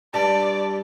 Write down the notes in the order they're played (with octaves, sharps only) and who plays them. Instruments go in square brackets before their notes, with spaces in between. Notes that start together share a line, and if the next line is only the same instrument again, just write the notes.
[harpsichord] G2 G3 [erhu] D5 [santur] A5